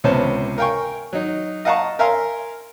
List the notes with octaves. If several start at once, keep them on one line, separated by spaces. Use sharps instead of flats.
C#2 C3 B3 C#4 C5 A5
A#4 F5 G5 G#5 C#6
F#3 D#4
D#5 F5 F#5 A5 A#5 C#6
A#4 E5 F5 G#5 A#5 C6